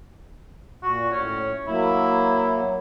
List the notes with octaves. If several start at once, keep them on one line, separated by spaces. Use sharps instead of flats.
A#2 F#4
A2 C#4
F#3 A#3 E4